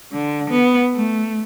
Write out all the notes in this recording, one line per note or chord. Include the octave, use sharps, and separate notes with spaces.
D3
B3
A3